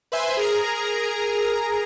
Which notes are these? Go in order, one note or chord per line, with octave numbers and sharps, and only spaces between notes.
B4 C5 E5 G#5 C6
G#4 A#4 A#5